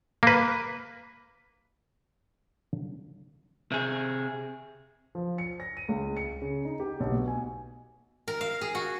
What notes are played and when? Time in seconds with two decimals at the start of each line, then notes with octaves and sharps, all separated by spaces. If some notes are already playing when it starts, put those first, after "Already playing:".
0.23 A#3 B4
3.72 C3 G#4
5.15 F3
5.38 C#7
5.60 A#6
5.77 D#7
5.89 C#2
6.17 C#7
6.42 C#3
6.65 D#4
6.80 G4
7.00 B1
7.12 B2
7.28 G#5
8.28 A#4
8.41 F5
8.61 G#4
8.75 F#4